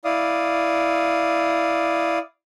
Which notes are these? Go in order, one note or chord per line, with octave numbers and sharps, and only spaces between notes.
E4 D5 F5 D#6